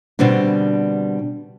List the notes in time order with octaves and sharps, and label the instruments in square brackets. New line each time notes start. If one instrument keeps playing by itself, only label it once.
[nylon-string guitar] B2 D3 G3 C4 D4